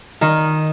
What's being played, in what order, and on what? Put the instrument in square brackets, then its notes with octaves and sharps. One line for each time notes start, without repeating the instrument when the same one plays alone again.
[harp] D#3